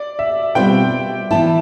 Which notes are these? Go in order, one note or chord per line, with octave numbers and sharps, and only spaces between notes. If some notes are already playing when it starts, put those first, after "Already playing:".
Already playing: D5
E5
B2 G3 C4 F4 B4 G5
E3 B3 E4 A5